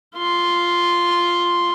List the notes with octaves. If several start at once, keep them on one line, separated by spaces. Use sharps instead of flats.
F4 C6